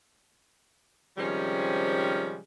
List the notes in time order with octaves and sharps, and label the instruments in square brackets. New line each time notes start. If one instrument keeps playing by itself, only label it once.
[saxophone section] C3 D#3 F3 G3 G#3 C#4